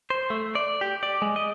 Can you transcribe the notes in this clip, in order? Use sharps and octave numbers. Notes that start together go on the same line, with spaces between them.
C5
A3
D5
G4
D5
G#3
D#5